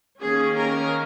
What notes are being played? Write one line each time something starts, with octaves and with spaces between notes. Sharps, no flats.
D#3 A#3 C#4 G#4
A#4